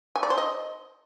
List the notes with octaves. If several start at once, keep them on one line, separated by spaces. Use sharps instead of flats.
G#5
D5
C5
D#5